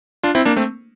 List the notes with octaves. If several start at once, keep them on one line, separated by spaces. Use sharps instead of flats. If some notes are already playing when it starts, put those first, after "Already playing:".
D4 F4
C4 E4
A#3 D4
A3 C4